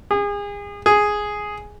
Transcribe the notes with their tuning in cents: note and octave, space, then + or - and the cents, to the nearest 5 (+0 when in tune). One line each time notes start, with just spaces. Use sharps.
G#4 -35
G#4 +0